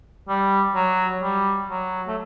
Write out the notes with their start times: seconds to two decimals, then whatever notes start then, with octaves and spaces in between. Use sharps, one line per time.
0.29 G3
0.75 F#3
1.22 G3
1.69 F#3
2.07 A3